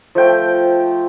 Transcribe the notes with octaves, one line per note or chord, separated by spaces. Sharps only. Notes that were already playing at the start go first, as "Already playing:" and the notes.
F3 A3 G5